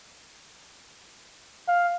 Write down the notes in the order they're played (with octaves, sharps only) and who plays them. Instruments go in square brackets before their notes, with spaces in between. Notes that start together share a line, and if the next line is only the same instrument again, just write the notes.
[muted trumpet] F5